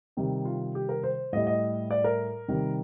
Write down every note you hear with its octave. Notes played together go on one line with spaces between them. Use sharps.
C3 D#3 G3
F4
G4
A#4
C5
A2 G3 D#5
D#5
D5
A#4
C3 D#3 G3